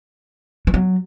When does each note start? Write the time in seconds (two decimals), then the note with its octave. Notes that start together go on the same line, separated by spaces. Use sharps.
0.67 E3
0.74 F#3